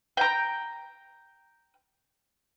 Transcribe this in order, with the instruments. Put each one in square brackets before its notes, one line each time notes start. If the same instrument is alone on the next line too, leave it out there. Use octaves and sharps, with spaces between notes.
[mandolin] G5 A#5